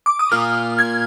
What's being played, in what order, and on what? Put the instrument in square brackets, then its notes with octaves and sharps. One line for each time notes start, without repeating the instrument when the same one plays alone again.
[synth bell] D6
D#6
[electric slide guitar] A#3 F4 A#4 [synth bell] F6
[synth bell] G#6